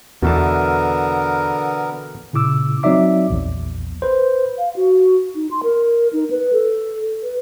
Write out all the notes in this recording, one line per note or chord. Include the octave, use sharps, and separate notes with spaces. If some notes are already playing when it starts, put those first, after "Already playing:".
E2 B2 D3 E3 B3 A#4 A5
A#2 C#3 E4 D6 E6
F#3 C4 D#4 D5 E5 D6
A#1 E2
B4 C5
F5
F#4
D#4
C6
A#4
D#4
B4
A4
B4